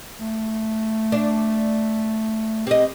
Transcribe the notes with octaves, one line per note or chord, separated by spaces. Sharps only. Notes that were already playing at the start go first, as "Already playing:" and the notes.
A3
D4
C4 G4 D#5